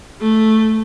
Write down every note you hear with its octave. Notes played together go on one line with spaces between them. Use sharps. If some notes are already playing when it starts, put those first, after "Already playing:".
A3